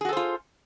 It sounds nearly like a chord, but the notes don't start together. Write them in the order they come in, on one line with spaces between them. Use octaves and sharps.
G#4 F#4 A4 C5 F4